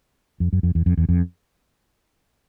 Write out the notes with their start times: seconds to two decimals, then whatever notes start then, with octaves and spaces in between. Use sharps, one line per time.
0.40 F2
0.53 F#2
0.63 F2
0.75 E2
0.86 F2
0.97 E2
1.09 F2